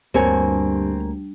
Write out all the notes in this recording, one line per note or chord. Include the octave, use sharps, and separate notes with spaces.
D2 G2 A#3 C4 C#5 G#5